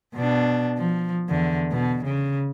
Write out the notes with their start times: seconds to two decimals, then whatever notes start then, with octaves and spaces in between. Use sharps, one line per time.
0.16 B2 D4
0.78 F3
1.30 E2 D3
1.71 B2
2.05 C#3